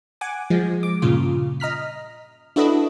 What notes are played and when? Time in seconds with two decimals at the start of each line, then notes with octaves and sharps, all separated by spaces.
0.21 F#5 G#5 D6
0.50 F3 G#3
0.83 D6
1.02 G2 A#2 C#3 F4
1.60 D#5 A#5 F6 B6
2.56 D4 E4 F#4 A4 B4 D#5